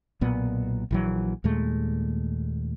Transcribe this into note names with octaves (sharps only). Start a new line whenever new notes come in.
B1 A#2 B3
A#1 E3 F#3
D#2 A#2 G#3 A3